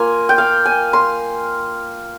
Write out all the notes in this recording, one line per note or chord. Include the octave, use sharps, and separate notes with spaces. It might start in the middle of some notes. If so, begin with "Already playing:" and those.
Already playing: A#3 F4 G#5
G5
F5
G#5
C6